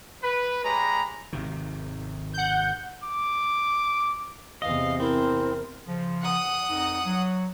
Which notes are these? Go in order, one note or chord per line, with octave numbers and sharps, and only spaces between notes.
B4
G#3 G4 C#5 A#5 B5
G#1 C3 D#3
F#5 G6
D6
E2 C3 D#5 F5
C4 E4 A#4
C#3 F3
F#5 D#6
F2 D#4
F#3